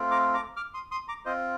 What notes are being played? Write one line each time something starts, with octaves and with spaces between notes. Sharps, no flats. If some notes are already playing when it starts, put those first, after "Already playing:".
Already playing: A3 C4 F4
A#5 D6
A#5 D6
D6 F6
C6 D#6
C6 D#6
A#5 D6
C4 F4 C5 D#5